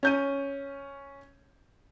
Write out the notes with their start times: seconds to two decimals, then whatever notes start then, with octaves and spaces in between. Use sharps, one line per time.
0.03 C#4 G6 D#7